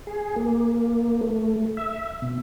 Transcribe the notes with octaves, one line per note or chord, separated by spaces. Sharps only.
G#4
A#3
A3
E5
B2